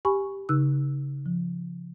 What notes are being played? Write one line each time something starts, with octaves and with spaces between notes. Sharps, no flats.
G4 G#5 B5 C#6
C#3 D#4 E6 F#6
F3